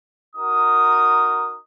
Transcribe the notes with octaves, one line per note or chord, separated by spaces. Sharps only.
D#4 F#4 A#4 D#6